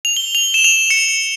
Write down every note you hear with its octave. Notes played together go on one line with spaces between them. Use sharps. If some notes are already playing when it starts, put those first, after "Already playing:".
F7
G7
F7
E7
F7
E7
C#7